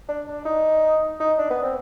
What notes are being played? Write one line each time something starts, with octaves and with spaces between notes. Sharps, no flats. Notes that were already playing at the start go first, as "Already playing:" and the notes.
D4
D4
D#4
D#4
D4
B3
C4